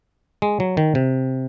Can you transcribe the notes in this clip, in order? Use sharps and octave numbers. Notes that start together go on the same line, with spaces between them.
G#3
F#3
D#3
C3